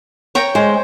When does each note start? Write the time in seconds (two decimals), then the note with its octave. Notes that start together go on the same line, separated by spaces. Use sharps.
0.35 C#5 G5 A#5
0.55 G#3 C5